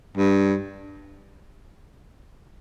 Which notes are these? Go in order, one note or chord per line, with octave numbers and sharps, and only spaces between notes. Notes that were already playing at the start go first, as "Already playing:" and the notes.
G2